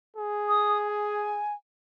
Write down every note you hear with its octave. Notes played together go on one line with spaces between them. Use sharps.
G#4
D#6
G#5